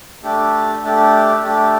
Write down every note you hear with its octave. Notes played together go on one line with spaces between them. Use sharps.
A3 D4 G4
A3 D4 G4
A3 D4 G4